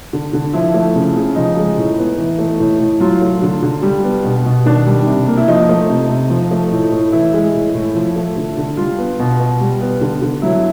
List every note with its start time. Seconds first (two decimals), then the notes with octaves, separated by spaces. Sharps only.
0.13 D3
0.33 D3
0.54 F3 E4
0.74 A3
0.95 C#3
1.16 C#3
1.36 F3 D#4
1.56 G#3
1.77 A2
1.98 B3
2.18 E3
2.39 A3
2.60 A2
2.80 A2
3.00 F#3 F4
3.21 A3
3.42 D3
3.62 D3
3.83 G3
4.04 B3
4.24 B2
4.46 B2
4.66 D#3 D4
4.87 G3
5.06 C3
5.27 A#3
5.37 E4
5.48 F3 D#4
5.69 A3
5.89 C3
6.10 C3
6.30 F3
6.51 A3
6.71 A2
6.92 A2
7.12 E3 E4
7.34 G#3
7.54 A2
7.75 A2
7.95 F3
8.16 A3
8.37 D3
8.57 D3
8.77 G3 F4
8.98 B3
9.19 B2
9.40 B2
9.61 G3
9.81 B3
10.01 D3
10.22 D3
10.42 F#3 E4